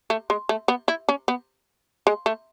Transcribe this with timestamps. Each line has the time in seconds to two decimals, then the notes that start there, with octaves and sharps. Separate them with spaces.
0.10 A3
0.30 G#3
0.49 A3
0.68 B3
0.88 E4
1.09 C#4
1.28 B3
2.07 G#3
2.26 A3